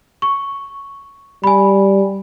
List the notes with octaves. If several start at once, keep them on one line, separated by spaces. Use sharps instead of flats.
C#6
G3 G#5 B5